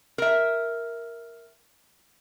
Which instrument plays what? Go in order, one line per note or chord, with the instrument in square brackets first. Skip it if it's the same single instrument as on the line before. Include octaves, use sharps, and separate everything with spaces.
[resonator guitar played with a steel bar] A#4 E5